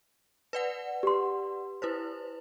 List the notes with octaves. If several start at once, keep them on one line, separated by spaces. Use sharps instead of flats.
B4 D5 F#5
G4 C6
E4 B4 C5